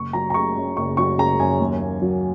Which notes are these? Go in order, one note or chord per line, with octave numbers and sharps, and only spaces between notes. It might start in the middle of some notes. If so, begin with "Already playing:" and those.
Already playing: F#1 C#6
F#3 A#5
A#5
C#3 C#6
F#2
F#1 C#6
F#3 C#6
C#3 A#5
F#2 G#5
D#2
A#3
F#3